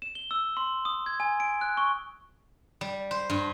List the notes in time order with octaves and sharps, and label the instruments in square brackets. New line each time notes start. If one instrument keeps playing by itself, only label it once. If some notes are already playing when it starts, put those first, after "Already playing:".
[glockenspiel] E7
G7
E6
C6
D#6
G#6
G#5
D7
F#6
C#6
[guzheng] G3
C5
G2